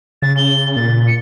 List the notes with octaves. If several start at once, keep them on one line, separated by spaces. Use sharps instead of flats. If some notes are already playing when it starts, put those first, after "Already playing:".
C#3 A6
G7
A#2 A6
C#7